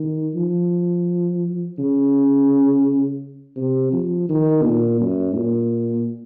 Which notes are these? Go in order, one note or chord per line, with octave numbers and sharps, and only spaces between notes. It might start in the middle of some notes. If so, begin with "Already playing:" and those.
Already playing: D#3
F3
C#3
C3
F3
D#3
A#2
F#2
A#2